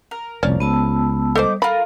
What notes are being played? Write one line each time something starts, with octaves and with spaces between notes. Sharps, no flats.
A#4
F1 C2 F3 C#4 D5
C#2 B3 A5 E6
G3 D#4 A4 C5 D6
F4 A4 A#4 B5